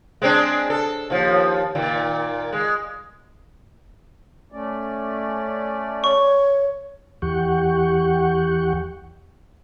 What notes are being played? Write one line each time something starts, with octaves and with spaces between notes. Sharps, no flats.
G#3 C4 D4
A4
D#2 F3
A#2 D#3
G#3
A3 C#4 D5
C#5 C#6
E2 E3 G4 F#5 G5 C#6